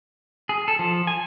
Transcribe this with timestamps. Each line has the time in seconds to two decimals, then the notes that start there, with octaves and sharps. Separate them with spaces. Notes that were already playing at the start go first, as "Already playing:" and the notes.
0.49 G#4
0.68 A4
0.79 F3
1.07 G#5